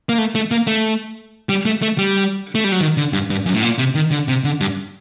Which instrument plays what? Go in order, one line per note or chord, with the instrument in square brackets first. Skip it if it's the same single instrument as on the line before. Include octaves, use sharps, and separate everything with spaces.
[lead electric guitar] A#3
A3
A3
A#3
A3
G3
A3
A3
G3
A3
G3
F#3
D#3
D3
G2
G2
F#2
A2
A#2
C3
D#3
D3
C3
D3
G2